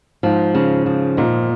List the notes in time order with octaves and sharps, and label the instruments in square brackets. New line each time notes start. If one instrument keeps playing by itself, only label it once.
[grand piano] G#2 [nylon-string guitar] F3
[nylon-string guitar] C#3
F3
[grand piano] A#2 [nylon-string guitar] D#4